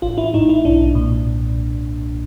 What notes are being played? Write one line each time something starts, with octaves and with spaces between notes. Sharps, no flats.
A1 F4
E4
G#2 D#4
E4
B1 D4
A#2